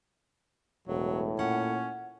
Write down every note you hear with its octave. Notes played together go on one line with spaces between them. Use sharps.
E1 A2 F#3
A#2 C#4 F#5